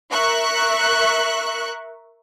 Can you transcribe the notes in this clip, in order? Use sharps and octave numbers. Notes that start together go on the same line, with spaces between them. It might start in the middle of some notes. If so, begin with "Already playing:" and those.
A#4 E5 C#6 F#6